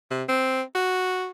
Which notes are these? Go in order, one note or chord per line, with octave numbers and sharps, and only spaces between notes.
C3
C4
F#4